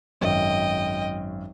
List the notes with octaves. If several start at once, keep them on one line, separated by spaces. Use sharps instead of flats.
G#1 F#2 D#5 G5